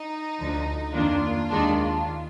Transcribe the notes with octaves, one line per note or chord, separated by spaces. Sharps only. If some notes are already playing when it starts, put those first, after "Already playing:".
Already playing: D#4
D2 D3 F3
F2 D#3 A#3 D4 F4
D#2 D#3 G#3 D4